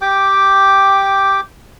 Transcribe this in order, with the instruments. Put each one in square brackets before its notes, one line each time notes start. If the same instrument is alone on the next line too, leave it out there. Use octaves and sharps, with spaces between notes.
[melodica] G4 G5 D6